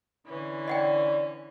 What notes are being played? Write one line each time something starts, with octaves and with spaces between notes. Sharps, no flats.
D3 E3 C#4
D5 D#5 F#5 G5